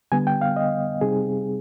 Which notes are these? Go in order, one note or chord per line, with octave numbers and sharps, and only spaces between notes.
D3 G3 B3 G#5
G5
F5
D#5
C3 G3 C4 D#4 G#4